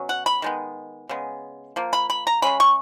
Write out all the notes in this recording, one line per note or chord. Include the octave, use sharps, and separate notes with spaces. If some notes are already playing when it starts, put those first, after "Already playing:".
Already playing: B2 F#3 C#4
F#5
B5
D#3 G#3 B3
C#3 G#3 B3
F3 A#3
B5
B5
A#5
C#3 G#3 C#4 B5
C#6